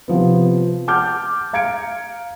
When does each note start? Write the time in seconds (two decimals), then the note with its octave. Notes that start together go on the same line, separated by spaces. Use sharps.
0.08 C3 F3 B3
0.88 F#5 A5 D6 F6 G6
1.53 F5 A#5 G#6 C#7 D7